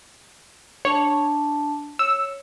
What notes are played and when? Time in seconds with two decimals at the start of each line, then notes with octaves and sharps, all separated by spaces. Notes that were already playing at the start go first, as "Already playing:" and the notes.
0.85 D4 C#5 A5
1.99 C#5 E6